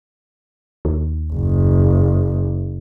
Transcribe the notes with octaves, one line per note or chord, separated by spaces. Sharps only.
D#2
F#1